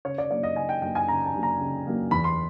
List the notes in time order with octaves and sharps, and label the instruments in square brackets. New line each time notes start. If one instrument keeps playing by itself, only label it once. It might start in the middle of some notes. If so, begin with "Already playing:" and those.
[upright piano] C#3 C#5
D5
F#3 A#3 D4 D5
D#5
C#3 G#5
G5
F#3 A#3 D4 G5
G#5
C#3 A#5
A5
F#3 A#3 D4
A#5
C#3
F#3 A#3 D4
E2 B5
C6